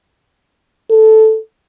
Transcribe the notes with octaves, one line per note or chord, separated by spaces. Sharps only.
A4